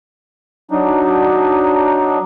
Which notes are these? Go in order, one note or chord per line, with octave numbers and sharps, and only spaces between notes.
F#3 D4 D#4